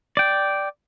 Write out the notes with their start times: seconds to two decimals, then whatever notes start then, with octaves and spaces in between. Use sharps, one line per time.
0.17 D5 G5